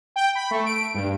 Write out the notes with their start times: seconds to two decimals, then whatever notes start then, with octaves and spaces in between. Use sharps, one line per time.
0.16 G5
0.35 B5
0.51 A3
0.66 D7
0.94 G2